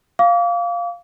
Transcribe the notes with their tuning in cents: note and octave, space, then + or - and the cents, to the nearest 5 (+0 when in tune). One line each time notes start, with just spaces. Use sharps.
F5 +0 D6 -40